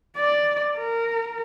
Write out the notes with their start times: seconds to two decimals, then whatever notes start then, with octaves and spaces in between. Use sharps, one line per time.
0.17 D5
0.77 A#4